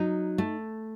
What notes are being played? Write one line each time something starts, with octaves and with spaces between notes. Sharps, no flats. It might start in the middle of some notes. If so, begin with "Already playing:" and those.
Already playing: F#3 D#4
A3